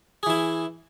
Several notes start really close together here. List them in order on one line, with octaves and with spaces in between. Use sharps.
G#4 E3 E4